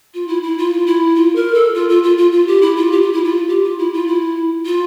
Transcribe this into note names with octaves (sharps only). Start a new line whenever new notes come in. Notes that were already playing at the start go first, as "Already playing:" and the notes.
F4
E4
E4
F4
E4
F4
A#4
A4
F4
F4
F4
F4
F4
G4
E4
F4
G4
F4
E4
F4
G4
F4
E4
F4
E4
F4